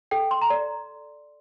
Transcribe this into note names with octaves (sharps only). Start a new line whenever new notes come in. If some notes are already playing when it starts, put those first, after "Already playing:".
A4 G5
C6
A#5
D5